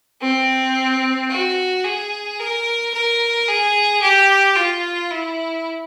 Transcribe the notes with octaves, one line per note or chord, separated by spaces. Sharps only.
C4
F#4
G#4
A#4
A#4
G#4
G4
F4
E4